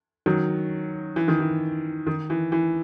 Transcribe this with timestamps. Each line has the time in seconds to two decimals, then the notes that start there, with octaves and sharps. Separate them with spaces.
0.26 D#3 F#3
1.16 E3
1.28 D#3
1.40 E3
2.07 D#3
2.30 E3
2.52 E3